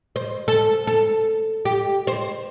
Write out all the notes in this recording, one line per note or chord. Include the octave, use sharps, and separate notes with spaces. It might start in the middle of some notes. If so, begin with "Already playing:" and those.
C5
A4
A4
G4
C5